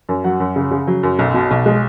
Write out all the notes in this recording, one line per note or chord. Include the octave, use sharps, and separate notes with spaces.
F#2
F#3 F#5
F#2
C#3
C#3
F#3
F#2
B1
B2
B1
G#3